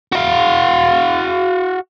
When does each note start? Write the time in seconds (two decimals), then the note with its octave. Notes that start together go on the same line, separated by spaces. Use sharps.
0.12 F#4 F5